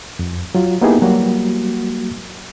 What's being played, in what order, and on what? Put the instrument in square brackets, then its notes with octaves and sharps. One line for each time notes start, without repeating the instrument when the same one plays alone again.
[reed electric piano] F2
F#3 F4
A#3 B3 D#4 E4 G4 G#4
F#3 G3 A#3 F#4